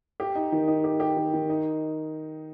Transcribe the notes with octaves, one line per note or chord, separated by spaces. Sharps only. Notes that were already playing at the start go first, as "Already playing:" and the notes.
G4
D#4
D#3
D#4
G4
G4
D#3
D#3
D#4